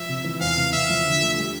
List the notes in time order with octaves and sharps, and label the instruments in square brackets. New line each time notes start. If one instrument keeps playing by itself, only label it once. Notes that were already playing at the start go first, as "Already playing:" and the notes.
Already playing: [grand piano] F3 [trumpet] E5
[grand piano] C3
E3
[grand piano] E2 [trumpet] F5
[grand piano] C3
[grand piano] C3 [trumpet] E5
[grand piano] F3
D3
A3
G3